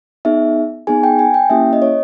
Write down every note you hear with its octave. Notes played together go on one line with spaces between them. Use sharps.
B3 D#4 G#4 E5
B3 D#4 G#4 G#5
G5
G#5
G5
A#3 C#4 E4 G4 E5
D#5
C#5